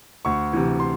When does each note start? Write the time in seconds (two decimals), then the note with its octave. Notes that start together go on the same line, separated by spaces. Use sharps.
0.25 D2 C#6
0.53 C3 E3
0.80 C6